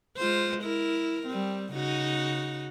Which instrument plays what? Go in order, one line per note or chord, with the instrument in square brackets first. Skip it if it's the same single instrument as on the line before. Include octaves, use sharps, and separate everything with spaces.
[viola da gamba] G#3 F4 C5
E4 A#4
G3 C4
C#3 D#4 F#4